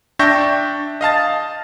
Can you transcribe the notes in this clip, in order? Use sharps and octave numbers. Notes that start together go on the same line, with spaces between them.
D4 E5 G5 C#6 G6 A#6
D#5 F5 A5 A6